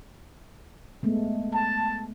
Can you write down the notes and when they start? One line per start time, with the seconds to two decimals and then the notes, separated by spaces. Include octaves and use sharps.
1.03 G#3 A3 B3
1.54 A5